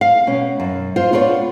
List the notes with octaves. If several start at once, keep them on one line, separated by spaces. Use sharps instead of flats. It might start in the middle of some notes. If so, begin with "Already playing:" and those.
F5
B2 C#4
F#2
F4 C5
B3 D4 F4 A#4 C#5